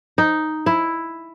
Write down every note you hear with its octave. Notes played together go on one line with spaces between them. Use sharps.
D#4
E4